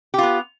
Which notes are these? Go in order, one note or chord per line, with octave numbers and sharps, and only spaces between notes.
B3 F4 G4